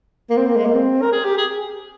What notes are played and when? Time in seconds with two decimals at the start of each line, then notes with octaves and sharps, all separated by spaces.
0.30 A#3
0.37 C4
0.46 A#3
0.56 G#3
0.65 A#3
0.74 C4
1.02 A#4
1.12 G#4
1.24 G4
1.37 G#4